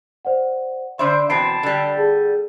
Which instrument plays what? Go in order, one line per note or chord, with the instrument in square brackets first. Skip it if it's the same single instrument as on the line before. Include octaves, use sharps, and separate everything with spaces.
[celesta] C5 D5 F#5
[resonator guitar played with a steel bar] D3 D4 E5 [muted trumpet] C5 [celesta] B5
[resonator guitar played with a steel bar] E2 B2 C4 [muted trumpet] A5 [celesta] B5 C7 D7
[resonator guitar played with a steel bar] D3 G3
[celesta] G#4